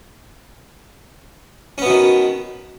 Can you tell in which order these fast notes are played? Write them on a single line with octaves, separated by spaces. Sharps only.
C#4 B3 B2 D#3